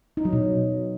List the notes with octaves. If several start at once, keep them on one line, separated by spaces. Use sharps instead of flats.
D#4
F#3
B2